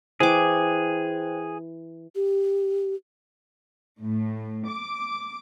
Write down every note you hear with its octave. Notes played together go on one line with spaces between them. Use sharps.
E3 G#4 C5 G5 D6
G4
A2
D6